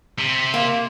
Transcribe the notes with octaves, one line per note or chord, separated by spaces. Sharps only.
C3
A#3